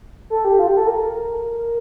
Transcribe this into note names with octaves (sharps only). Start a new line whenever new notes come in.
A4
G4
F4
G4
A4
A#4